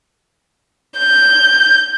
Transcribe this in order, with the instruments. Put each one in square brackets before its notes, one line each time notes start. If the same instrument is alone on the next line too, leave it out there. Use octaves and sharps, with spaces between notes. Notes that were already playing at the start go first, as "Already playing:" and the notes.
[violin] G6